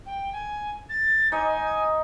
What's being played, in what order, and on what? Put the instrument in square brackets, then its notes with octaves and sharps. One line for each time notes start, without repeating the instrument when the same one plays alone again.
[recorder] G5
G#5
A6
[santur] D#4 D#5 [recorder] G#5